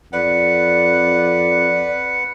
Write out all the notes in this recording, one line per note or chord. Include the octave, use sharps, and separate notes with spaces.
F2 B4 D5 F#5